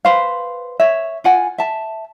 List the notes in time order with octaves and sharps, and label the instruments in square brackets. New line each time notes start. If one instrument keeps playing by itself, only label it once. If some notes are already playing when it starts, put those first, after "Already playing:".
[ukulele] B4 C5 F5
C#5 E5
F4 F#5 G#5
E5 A5